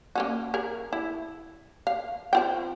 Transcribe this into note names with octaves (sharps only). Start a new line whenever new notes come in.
A#3 C#4 F#4
G#4 A#4
E4
F5
C4 F4 G5